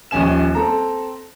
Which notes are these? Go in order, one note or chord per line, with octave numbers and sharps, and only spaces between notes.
D#1 A#1 C#4 G#5 E7
C4 A4 A#5